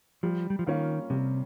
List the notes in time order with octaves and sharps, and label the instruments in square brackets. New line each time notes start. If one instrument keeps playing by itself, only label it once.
[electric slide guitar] F3 [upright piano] G3
[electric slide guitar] G3
F3
[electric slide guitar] D#3 [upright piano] A#3 C#4 F4
[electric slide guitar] C3 [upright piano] G3